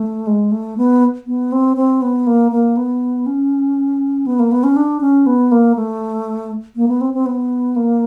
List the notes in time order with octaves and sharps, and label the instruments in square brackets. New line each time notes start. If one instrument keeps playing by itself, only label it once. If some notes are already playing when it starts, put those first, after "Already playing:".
Already playing: [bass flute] A3
G#3
A3
B3
B3
C4
C4
B3
A#3
A#3
B3
C#4
B3
A#3
B3
C#4
D4
C#4
B3
A#3
A3
A#3
B3
C4
C4
B3
A#3